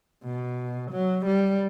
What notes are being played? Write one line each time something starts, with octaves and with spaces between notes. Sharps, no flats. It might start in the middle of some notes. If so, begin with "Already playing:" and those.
B2
F#3
G3